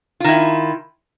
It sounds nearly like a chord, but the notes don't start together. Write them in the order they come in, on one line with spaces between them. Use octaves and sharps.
F4 D#3 E4